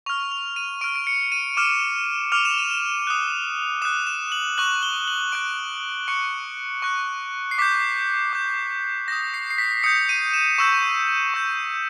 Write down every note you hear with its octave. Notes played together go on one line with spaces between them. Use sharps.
C#6 F6 F7
F7
D#7
C#6 F6 D7
D7
C#7
D#7
D6 F6 E7
D6 F6 F7
E7
D#7
E7
D#6 F#6
D#6 F#6 E7
E7
F#7
C#6 F#6 F#7
G7
F#7
C#6 F#6 D7
C#6 F#6 C#7
C#6 F#6
C7
D6 G6 B6
D6 G6
D#6 G6 A#6
C7
C7
B6
D#6 G6 C#7
D#7
E7
C#6 E6 G6 E7
C#6 E6 G6